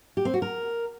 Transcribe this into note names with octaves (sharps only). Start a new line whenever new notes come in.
G4
C4
F#4
A#4